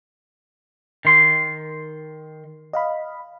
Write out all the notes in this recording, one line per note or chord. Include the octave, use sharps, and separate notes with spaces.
D#3 C6
D#5 F5 B5